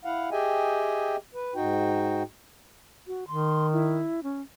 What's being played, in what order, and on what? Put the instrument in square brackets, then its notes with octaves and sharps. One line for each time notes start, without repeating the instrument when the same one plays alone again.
[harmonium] E4 F5 F#5
G4 G#4 D#5 E5 G5 G#5
B4
G#2 D#4 F#4 G5
[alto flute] F#4
[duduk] D#3 [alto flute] C6
[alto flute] E4
C#4